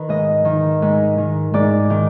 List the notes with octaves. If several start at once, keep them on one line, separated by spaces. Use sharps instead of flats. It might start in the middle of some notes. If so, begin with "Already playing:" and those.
Already playing: D#3 B4
G#2 D#5
D#3
G#2
D#3
G#2 D5
D#3